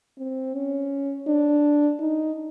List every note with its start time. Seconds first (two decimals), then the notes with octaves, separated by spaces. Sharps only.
0.18 C4
0.54 C#4
1.27 D4
2.00 D#4